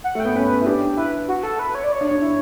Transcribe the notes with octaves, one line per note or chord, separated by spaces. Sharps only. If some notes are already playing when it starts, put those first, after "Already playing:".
F#5
A3 G5
B3
C#4 B4
E4
D4 G4
E4 B4
F#4
A4
B4
C#5
D5
C#5
D4
D4
E4